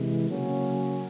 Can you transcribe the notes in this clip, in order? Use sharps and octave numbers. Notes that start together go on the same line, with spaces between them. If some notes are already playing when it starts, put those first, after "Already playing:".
Already playing: C3 E3 G#3
C#3 F#3 A#3 C#4